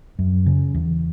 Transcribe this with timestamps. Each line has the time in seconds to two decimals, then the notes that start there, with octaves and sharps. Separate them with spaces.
0.19 F#2
0.46 C#3
0.74 E2